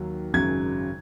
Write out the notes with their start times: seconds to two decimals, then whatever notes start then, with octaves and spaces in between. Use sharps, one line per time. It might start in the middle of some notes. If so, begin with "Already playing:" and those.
Already playing: D#2 D#3 F#3
0.33 G#1 F#2 C#3 F#3 G#6